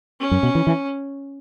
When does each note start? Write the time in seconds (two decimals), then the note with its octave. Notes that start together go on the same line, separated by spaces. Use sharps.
0.20 C#4
0.31 F#2
0.43 B2
0.55 E3
0.67 E3